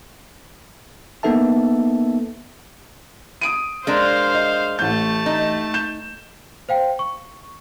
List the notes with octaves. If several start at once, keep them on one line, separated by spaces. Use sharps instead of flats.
A#3 B3 D#4 A4 E5 A5
D#6 D7 D#7
G#3 D4 A#4 C5 F5
D#5
A1 A3 A5 G6
D#4
G6 E7
C5 F5 G5
C#6